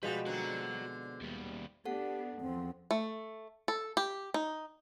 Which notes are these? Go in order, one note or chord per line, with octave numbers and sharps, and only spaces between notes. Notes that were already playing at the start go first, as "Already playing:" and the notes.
B2 F3 G3 G#3 B4
D3 C4 F#4 A#5
D#2 G3
B3 D4 G4 A4 F#5
E2 F3 C4
A3
A4
G4
D#4